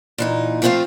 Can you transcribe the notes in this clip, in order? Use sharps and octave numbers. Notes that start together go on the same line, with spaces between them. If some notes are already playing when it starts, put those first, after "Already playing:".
A#2 E3 D#4
F3 A3 C4 C#4 F4 F5